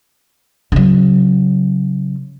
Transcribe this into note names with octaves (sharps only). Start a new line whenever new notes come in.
C#3 F#3